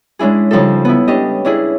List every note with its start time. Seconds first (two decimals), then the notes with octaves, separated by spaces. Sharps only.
0.19 G#3 C#4 D4 E4 G#4
0.51 C#3 F3 G3 D#4 A4
0.85 B3 E4
1.08 C#4 D4 G4 D#5
1.45 C#4 D4 E4 G#4